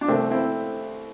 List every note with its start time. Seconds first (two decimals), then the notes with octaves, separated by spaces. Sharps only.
0.01 D4
0.08 C2 A3 C4
0.31 C4 E4